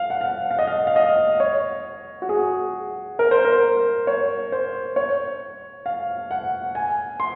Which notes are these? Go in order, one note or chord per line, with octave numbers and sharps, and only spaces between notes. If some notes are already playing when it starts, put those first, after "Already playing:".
Already playing: F5
F#5
F5
F5
D#5
F5
F5
D#5
C#5
F#4
G#4
A#4
C5
A#4
C#5
C5
C#5
F5
F#5
G#5
C6